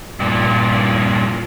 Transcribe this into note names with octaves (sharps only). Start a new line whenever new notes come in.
G2 A#2